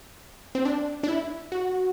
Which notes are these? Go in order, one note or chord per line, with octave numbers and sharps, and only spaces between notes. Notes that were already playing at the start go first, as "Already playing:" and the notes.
C4
D4
D4
E4
F#4